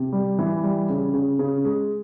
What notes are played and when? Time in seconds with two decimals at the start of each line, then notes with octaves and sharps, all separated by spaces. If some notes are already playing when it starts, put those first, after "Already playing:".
Already playing: C3
0.13 G3
0.39 E3
0.64 G3
0.89 C#3
1.14 C#3
1.39 C#3
1.65 G#3